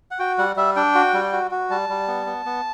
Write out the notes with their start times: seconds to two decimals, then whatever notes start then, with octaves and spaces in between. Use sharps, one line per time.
0.11 F#5
0.19 F#4 G5
0.38 G3 F#5
0.56 G3 E5
0.76 D4 G5
0.95 F#4
1.13 G3
1.33 F#4
1.51 F#4
1.70 G3 A5
1.89 G3
2.08 B3
2.26 B3
2.46 B3